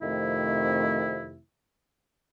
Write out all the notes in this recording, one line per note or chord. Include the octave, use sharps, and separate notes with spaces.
F2 C3 D#3 A3 E4